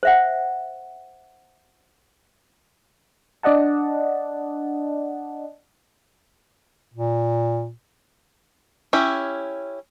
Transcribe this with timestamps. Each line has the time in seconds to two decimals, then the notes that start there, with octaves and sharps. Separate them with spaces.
0.03 C5 E5 F#5
3.43 D4 D5 D#5 F#5 A5
6.93 A#2
8.93 C#4 E4 G4